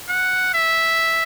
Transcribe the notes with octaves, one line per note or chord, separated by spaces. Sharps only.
F#5
E5